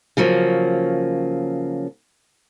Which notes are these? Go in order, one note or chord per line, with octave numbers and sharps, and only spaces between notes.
C#3 F3 F#3 A#3